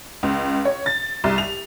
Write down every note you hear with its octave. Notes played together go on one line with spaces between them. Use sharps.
C#2
C#5
A6
C2
F7